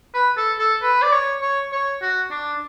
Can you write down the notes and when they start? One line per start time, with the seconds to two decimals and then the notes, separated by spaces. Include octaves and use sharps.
0.14 B4
0.37 A4
0.59 A4
0.82 B4
1.02 D5
1.12 C#5
1.41 C#5
1.72 C#5
2.02 F#4
2.31 D4